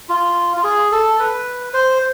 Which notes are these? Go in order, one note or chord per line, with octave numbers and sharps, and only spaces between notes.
F4
F4
G#4
A4
B4
C5